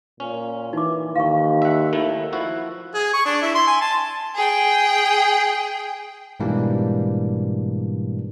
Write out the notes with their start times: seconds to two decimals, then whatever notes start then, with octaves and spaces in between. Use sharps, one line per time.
0.20 A#2 C#4
0.73 E3 D#4 D6
1.16 D#2 F5 C#6
1.62 E5 F#5
1.93 D#3 A3 E4
2.33 F3 E4 F#4
2.95 G#4
3.13 C#6
3.25 D4
3.42 E4
3.55 C6
3.67 G#5
3.81 A5
4.35 G#4 G5
6.40 G#2 B2 E3 G3 A#3 D4